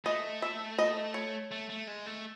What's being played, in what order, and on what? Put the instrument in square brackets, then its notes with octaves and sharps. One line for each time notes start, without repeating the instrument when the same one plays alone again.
[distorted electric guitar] A3 [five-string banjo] D#5
[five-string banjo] E5
D#5
C#5
[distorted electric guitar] A3
A3
G#3
A3